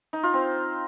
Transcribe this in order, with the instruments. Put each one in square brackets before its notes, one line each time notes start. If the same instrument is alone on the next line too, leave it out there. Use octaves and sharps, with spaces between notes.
[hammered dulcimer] D#4
F4
C4